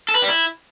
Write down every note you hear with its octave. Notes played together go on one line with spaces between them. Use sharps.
A4
B4
G3
E4